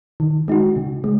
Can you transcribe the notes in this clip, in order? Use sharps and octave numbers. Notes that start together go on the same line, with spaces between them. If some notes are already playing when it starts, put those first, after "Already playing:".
D#3
G#3 D#4 F#4
C#3
G#3